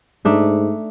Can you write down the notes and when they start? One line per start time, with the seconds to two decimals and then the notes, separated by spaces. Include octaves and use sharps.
0.25 G#2 A3 D4 D#4